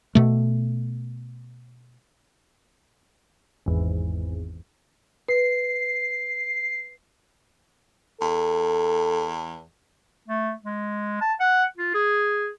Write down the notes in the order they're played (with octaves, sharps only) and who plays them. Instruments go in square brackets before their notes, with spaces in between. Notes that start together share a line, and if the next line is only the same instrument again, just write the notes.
[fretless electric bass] B2 A3
[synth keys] G#1 E2
[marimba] B4 [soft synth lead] C7
[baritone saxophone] E2 [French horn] A4
[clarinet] A3
G#3
A5
F#5
F4
G#4